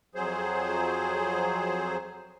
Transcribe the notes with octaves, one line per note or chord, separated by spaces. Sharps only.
F2 F#3 G#4 C5